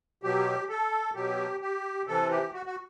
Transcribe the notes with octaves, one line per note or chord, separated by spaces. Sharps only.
B2 F#3 G4
A4
B2 F#3 G4
G4
C3 E3 A4
G4
F#4
F#4